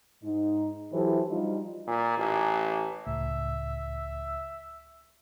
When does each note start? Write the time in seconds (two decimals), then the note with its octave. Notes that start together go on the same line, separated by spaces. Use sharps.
0.24 G#2 D#4
0.93 E3 F#3 E4 G4 A4 C5
1.29 F3 G3 D4 D#4 F4 F#4
1.87 A#2
2.18 A1
3.07 C#2 A2 E5